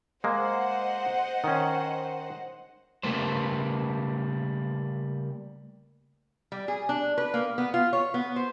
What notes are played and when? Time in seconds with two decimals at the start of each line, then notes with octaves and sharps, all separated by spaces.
0.24 G#3 A#3 C5 D#5 F#5
1.44 D#3 C#4
3.03 C#3 G3 A3 A#3 B4 C5
6.52 G3
6.68 G#4
6.89 D4
7.18 B4
7.34 A#3
7.58 B3
7.74 F4
7.93 C#5
8.14 B3
8.36 C5